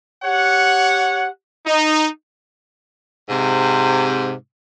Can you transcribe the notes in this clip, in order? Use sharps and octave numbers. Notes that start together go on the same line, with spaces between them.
G4 C#5 F#5
D#4
G#2 C3